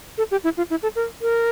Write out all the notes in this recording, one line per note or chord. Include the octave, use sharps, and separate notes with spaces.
A4
G4
E4
F4
E4
A4
A#4
A#4